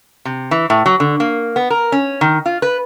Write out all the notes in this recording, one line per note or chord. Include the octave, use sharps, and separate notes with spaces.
C3
E3
A2
F#3
D3
A#3
B3
A#4
C#4
D#3
F4
B4